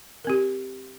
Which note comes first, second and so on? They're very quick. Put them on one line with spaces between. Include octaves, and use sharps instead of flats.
A#4 C4 G4